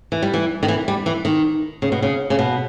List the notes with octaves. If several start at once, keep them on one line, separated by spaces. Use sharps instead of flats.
E3
G3
E3
D#3
E3
G3
E3
D#3
C#3
B2
C#3
C#3
B2